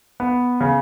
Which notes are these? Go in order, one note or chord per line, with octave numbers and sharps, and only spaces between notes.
B3
C#3